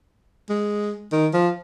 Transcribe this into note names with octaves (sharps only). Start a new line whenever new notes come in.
G#3
D#3
F3